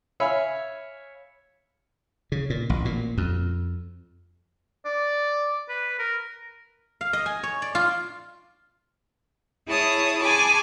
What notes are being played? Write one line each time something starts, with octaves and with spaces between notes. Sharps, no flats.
C#5 E5 F5 G#5 B5
C#3
A#2
A1
A#2
F2
D5
B4
A#4
F5
D#5
G#5
C#5
D5
F4
E4 G#4 C#5 A5 D#6
G#4 G#5 A5 B5 C#6 D6